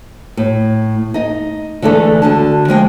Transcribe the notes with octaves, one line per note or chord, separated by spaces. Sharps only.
A2
D#4 D#5
D3 E3 G#3 A3 D4 A4
D2 D3 A5
F3 G#3 G5